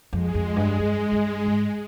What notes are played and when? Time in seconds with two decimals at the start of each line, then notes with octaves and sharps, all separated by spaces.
0.12 F2 G#3
0.34 F2
0.56 G2
0.79 G2
1.12 G2
1.46 G#2